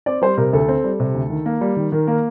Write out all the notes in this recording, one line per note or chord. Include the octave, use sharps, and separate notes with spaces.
C4 D5
G3 C5
C3 A#4
D2 A4
C4
G3
C3
D2
D#3
A#3
G3
D#3
D#3 A#4
A#3 A#4